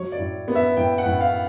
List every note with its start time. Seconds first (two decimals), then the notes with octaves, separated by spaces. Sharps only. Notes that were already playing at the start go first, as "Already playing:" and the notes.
Already playing: F#3 C#5
0.12 D5
0.19 A2
0.48 B3
0.55 E5
0.77 A2 G5
0.98 F#5
1.05 A2
1.21 F5